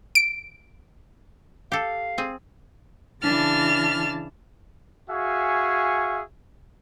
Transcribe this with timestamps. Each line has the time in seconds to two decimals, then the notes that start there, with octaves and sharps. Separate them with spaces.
0.15 D7
1.72 G4 A4 F5
2.18 C4 G#4
3.22 C#3 E3 D4 A5 F6 A6
5.09 F#4 G#4 E5 F5 G#5 C#6